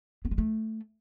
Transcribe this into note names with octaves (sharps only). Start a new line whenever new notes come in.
B3
G#3
A3